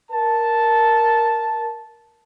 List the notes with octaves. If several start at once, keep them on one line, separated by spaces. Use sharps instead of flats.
A#4 A5